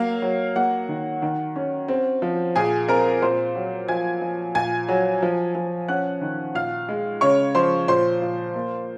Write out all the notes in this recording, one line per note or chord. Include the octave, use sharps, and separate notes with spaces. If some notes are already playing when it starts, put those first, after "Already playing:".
Already playing: F#3 A#3 F5
F#3
A#3 F#4 F#5
D#3
D#3
C#4
C4
F3
A#2 G#4 G#5
C4 A#4 A#5
A#2 C5 C6
F#3
F3 G#5 G#6
F3
A#2 G#5 G#6
F#3
F3
F3
C#4 F#5 F#6
D#3
A#2 F5 F6
G#3
C#3 C#5 C#6
F3 C5 C6
A#2 C5 C6
A#2
A#3